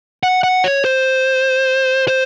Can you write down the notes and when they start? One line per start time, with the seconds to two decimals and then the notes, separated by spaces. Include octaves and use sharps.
0.23 F#5
0.44 F#5
0.64 C#5
0.85 C5
2.08 C5